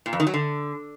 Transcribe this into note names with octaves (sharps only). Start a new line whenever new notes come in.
A#2
F2
D#3
F#3
D3